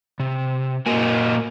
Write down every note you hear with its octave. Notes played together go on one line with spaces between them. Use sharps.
C3
A#2 A#3 F#4 D#5 G#5